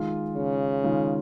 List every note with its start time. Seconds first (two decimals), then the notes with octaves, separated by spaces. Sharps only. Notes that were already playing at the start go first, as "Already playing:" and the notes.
Already playing: D#3 G#3 F4
0.36 C#3
0.84 D#3 G#3 F4